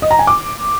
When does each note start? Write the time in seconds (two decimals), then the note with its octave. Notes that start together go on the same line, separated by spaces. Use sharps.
0.02 D#5
0.11 A#5
0.19 G#5
0.27 D6